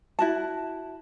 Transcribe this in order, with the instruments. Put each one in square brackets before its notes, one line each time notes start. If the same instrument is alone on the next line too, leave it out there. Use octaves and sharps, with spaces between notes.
[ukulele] E4 F#4 A5